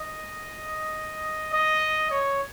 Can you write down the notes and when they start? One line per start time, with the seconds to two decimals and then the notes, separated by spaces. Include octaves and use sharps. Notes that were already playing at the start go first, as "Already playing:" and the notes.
Already playing: D#5
1.53 D#5
2.11 C#5